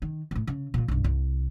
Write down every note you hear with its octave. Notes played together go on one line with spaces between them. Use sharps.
D#3
D2 A2
C#3
A#2 G3
B1 G2
C2